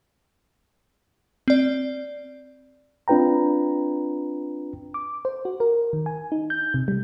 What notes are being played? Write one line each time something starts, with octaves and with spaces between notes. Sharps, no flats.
C4 D5
C4 D4 F4 B4 G5 A#5
D6
C5
F#4
A#4
D#3
G#5
D#4
G6
C3
G3